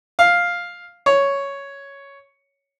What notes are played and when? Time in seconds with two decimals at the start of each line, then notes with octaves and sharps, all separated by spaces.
0.19 F5
1.06 C#5